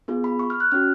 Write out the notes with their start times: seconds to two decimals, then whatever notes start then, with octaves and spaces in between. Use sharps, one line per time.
0.08 B3 F4 G#4
0.24 B5
0.39 C#6
0.50 F6
0.60 F#6
0.72 C#4 F#4 F6